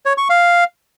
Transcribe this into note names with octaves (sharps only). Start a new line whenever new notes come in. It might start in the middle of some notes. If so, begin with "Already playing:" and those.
C#5
C#6
F5